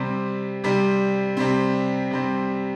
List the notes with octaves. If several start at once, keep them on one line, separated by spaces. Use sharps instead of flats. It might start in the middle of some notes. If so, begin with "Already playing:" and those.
Already playing: C3 G3 C4
C3 G3 C4
C3 G3 C4
C3 G3 C4